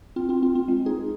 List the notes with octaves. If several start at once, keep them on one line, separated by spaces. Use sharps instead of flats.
C4 F4
C4 F4
C4 F4
C4
G#3
D#4 G#4